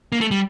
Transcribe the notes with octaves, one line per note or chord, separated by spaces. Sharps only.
A#3
A3
G3